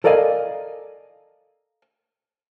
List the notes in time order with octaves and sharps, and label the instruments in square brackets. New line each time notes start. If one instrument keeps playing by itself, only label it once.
[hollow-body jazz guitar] A4 A#4 D5 D#5 F5 G#5